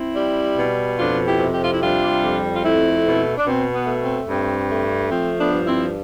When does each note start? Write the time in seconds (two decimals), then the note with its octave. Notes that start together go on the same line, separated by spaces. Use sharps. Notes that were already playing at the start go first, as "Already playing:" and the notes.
Already playing: C4 E4
0.15 G3
0.57 B2
0.98 F2 D4 F4
1.25 E4 G4
1.39 C3
1.54 G4
1.63 F4
1.73 E4
1.81 G3 D4 F4
2.22 F2
2.56 F4
2.64 A3 C4 E4
3.04 B2
3.37 D4
3.46 B2 C4
3.73 B3
3.86 A3
4.01 C4
4.28 G2 C4
4.70 A3
5.10 F3 C4
5.39 B3 D4
5.52 G2
5.65 C4 E4